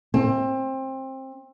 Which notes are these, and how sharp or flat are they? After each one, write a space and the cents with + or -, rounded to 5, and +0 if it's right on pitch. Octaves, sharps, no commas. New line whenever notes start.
C4 +25